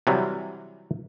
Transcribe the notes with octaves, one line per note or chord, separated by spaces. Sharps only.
C3 E3 F#3 G3